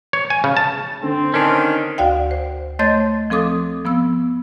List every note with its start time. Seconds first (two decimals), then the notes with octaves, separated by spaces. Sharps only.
0.13 C#5
0.30 G#5
0.44 C#3
0.57 A5
1.03 D3 C4
1.34 D#3 C#4 D4
1.98 D2 F#4 D5 F5 G5
2.31 C5
2.79 A3 C#5 D#5 C6 G6 A6
3.30 F3 C4 A4 D6 D#6
3.85 F3 B3 E6